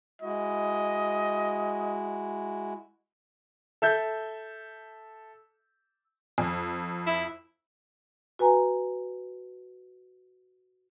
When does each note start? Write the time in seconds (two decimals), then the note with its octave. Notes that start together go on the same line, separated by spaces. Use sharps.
0.22 G#3 E4 F#4 D#5
3.82 A4 E5 G6
6.38 F2
7.07 E4
8.39 F#4 B4 G#5 A#5